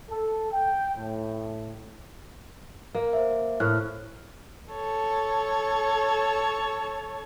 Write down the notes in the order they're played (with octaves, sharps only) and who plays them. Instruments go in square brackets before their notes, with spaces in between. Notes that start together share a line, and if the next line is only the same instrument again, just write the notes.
[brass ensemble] A4
G5
A2
[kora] A#3
[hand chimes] C5 E5
[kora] A2 [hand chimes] A#4 F6 F#6
[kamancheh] A4 C#5